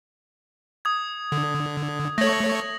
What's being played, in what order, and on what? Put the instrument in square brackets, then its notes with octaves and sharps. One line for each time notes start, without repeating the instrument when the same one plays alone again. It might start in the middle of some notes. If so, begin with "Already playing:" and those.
[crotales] D#6 G#6
[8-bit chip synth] D3
[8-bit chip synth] A3 C#5 [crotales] A#6 F#7